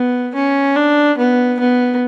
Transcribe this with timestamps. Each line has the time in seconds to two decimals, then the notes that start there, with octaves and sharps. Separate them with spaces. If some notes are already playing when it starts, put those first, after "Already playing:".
Already playing: B3
0.35 C#4
0.76 D4
1.17 B3
1.59 B3